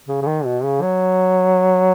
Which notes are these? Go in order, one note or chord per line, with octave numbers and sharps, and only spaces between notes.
C#3
C#3
D#3
B2
C#3
F#3